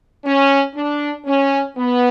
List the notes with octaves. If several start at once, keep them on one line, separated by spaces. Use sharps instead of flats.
C#4
D4
C#4
B3